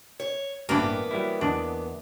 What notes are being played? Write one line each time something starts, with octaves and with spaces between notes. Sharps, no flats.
C#5
A1 G2 E3 A#3 B3 D4 A#4
F#3 G3 E4
E2 D4 D#5